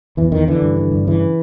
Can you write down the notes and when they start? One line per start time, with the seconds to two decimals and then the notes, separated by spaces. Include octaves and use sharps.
0.17 E2 E3
0.32 E2 D#3
0.48 D3 E3
0.62 G2
0.76 D3
0.92 G2
1.07 C#3 E3